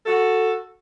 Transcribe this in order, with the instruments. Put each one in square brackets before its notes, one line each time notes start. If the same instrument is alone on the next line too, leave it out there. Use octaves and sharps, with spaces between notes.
[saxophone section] F#4 A4